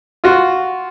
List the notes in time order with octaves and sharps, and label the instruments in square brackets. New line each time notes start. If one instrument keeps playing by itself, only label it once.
[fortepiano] F4 F#4